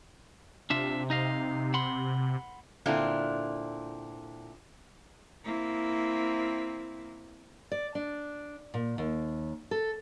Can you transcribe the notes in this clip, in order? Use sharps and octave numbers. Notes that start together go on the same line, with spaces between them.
C3 D4 F4 E5
D#4 D#5 F5
F#5 B5 C6
A#2 D3 C4 D4 E4 F4
A#3 C4 E4
D5
D4
A#2
D#2
A4